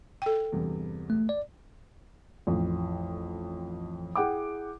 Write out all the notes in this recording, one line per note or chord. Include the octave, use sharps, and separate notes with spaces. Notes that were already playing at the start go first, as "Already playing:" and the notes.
A4 G5
E2 G2 C3
A3
D5
A1 F2
E4 G#4 F#5 G5 D6